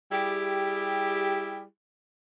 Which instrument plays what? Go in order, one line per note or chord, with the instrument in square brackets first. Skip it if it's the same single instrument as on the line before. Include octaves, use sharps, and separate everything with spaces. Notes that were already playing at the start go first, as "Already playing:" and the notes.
[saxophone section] G3 E4 G4 G#4